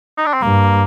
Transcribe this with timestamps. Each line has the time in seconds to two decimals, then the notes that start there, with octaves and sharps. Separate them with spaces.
0.18 D#4
0.26 D4
0.34 C4
0.42 G2 A#3